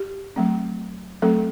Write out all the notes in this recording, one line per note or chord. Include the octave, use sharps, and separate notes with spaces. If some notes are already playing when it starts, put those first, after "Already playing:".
Already playing: G4
F#3 A3 C4
F#3 A3 C4 A4